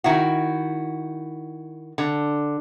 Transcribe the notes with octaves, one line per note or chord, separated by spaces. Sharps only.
D#3 E4 F#4
D3